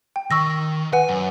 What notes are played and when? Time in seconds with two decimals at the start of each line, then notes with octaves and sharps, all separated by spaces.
0.16 G5
0.31 D#3 C#6 E6 A#6
0.93 B4 F#5 G#5
1.09 F#2